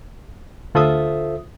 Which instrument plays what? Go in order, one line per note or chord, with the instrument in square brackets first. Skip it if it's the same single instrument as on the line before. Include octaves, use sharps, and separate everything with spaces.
[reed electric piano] D2 F4 A4 C5 E5 D#6